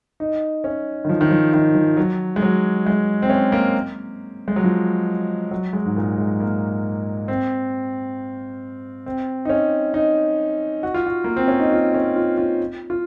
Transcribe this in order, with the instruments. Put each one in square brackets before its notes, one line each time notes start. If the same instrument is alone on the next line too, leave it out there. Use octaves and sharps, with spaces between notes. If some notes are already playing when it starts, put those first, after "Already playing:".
[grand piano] D#4
C#4
D#3
F3
D#3
F3
D#3
F3
F#3
G#3
F#3
G#3
C4
C#4
A#3
G#3
F#3
F3
F#3
G#3
G#2
A#2
G#3
A#3
C4
C4
D#4
C#4
D#4
F#4
F4
F#4
A#3
C4
C#4
D#4
F4
C#4
F4
F4
F4